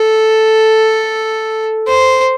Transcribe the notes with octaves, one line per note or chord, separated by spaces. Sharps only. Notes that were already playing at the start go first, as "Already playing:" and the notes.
Already playing: A4
C5